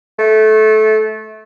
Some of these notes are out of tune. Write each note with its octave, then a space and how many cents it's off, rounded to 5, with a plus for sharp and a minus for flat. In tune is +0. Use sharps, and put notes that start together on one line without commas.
A3 -20